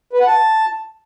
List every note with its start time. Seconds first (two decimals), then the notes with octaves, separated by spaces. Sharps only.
0.13 B4
0.20 F#5
0.27 A5